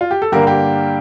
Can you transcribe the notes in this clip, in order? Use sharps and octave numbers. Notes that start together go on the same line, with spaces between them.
F4
G4
A4
G2 D3 G3 A#3 G4 A#4
G4 A#4